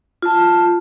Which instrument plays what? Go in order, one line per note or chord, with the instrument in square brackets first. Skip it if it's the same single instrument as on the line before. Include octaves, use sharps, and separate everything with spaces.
[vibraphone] F4 A5